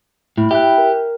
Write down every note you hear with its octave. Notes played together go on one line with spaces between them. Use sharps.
A2 E4
G4 E5 G5 F#6
A#4